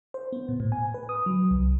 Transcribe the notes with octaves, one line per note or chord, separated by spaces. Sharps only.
C5
B3
A#2
A2
G#5
B4
D#6
F#3
C2